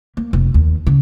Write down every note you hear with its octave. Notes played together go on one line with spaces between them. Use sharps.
A#3
F1
D#2
C#3